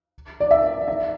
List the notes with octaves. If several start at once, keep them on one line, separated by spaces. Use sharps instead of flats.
D5
E5
E5